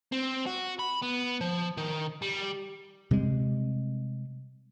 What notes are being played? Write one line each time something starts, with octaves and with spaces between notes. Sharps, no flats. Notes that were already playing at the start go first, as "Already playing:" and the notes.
C4
F#4
B5
B3
F3
D#3
G3
C3 G3 G#3